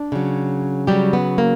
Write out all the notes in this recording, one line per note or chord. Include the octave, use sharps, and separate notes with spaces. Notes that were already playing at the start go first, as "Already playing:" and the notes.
Already playing: D4
C#3 F#3
C#3 F#3 G3 G4
B3
A#3